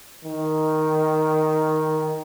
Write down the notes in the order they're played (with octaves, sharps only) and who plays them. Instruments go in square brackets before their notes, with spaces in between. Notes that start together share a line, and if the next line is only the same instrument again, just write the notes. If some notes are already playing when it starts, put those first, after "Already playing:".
[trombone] D#3